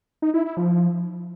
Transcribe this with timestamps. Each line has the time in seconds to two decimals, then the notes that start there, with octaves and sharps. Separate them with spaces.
0.22 D#4
0.34 E4
0.45 E4
0.57 F3